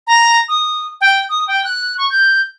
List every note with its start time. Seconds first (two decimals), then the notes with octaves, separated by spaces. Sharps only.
0.07 A#5
0.48 D#6
1.01 G5
1.29 D#6
1.48 G5
1.64 F#6
1.98 C#6
2.10 G6